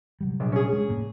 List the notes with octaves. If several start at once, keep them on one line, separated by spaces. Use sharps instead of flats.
C3 F#3 G3
A#1
C#4 G#4
G#3
F1 A2 A#3